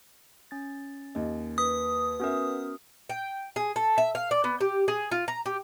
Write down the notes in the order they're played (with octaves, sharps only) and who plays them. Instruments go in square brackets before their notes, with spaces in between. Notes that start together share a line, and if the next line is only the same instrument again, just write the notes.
[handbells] C#4 A6
[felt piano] D#2 D#5
[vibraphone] B4 [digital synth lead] D#6
[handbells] B3 C#4 A#4 [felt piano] F#4 E5
[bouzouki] G5
G#4
A4
E5
F5
D5
B3
G4
G#4
F4
A#5
G4